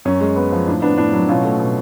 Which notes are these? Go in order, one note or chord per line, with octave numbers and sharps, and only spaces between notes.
F#2 C#4
G#3
B3
F3
A2 D4
B3 D4
A2 D4
F#3
B2 C#4 F4
A3
B2